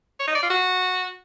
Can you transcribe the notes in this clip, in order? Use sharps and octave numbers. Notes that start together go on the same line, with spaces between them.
C#5
D#4
D5
F4
F#4